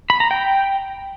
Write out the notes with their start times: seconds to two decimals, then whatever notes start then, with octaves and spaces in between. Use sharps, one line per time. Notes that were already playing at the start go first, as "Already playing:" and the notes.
0.10 B5
0.20 A#5
0.31 G5